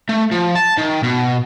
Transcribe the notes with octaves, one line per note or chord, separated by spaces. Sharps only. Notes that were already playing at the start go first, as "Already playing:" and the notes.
A3
F3
A5
D#3
B2